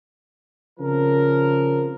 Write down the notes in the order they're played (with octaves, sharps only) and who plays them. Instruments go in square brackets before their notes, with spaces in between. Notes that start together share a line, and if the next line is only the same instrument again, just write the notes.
[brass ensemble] C#3 F3 C4 A#4